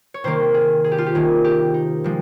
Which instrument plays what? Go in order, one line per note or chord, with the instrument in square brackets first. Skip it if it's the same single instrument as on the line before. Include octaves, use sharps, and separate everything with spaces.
[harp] C#5
C3 D#3 A#3 C5
G#4
G#4
G4
F4
G4
C3 D#3 A#3 G#4
G4
D#4
C3 F3 G#3